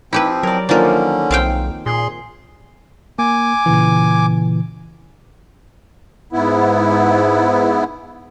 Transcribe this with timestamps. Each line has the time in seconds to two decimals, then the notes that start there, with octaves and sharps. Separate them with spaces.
0.13 F3 C4 D#4 E4 G4 B4
0.43 F#3 A#4 D5
0.69 D3 D#3 F3 A#3 C#4 D4 A#4
1.31 B1 C4 F5 G5
1.86 A#2 G#4 C6
3.19 A#3 G#5 D6
3.66 A#2 C#3 E3
6.33 G#2 B3 E4